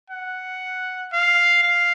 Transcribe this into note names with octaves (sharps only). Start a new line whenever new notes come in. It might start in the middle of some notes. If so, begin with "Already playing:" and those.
F#5
F5
F5